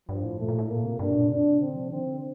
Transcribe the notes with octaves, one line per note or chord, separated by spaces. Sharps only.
G2 F3
A2
A#2 A3
A#2
A2
A#2 A#3
C3
G2 D4
C3
A#2
C3 D4
D3 C4
F3
D#3 C4
D3